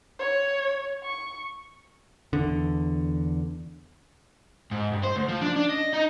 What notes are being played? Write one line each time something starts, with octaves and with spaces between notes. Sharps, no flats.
C#5
C#6
E2 D3
G#2
G2
C5
D2
F3
D4
D4
D#5
D#4